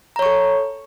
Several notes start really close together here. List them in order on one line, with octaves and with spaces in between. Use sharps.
A#5 C#5 C#6 A4